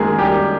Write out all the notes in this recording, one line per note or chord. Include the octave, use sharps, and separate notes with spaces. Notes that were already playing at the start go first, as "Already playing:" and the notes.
Already playing: F#2 D#3 G#3 A#3 G#4
F#2 G3 G4